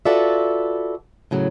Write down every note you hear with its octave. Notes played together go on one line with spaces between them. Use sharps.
F4 F#4 A4 B4 D5 E5
A2 C#3 F#3